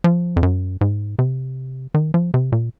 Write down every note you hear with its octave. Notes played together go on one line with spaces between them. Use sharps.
F3
F2
F#2
G#2
C3
D#3
F3
C3
A#2